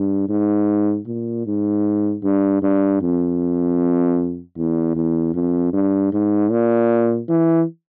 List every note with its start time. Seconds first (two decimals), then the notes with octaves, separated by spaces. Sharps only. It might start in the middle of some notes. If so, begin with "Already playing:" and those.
Already playing: G2
0.29 G#2
1.07 A#2
1.46 G#2
2.23 G2
2.62 G2
3.02 F2
4.57 E2
4.96 E2
5.35 F2
5.73 G2
6.13 G#2
6.51 A#2
7.29 E3